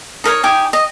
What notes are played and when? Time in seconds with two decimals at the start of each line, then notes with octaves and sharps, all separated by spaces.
0.24 D#4 A#4 B4 C#5
0.43 D#4 G4 G#5 D6
0.73 D#5